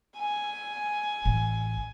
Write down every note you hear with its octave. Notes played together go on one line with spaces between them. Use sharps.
G#5
A1